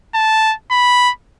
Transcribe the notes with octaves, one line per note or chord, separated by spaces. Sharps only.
A5
B5